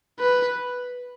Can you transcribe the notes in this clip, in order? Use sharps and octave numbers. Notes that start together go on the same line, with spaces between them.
B4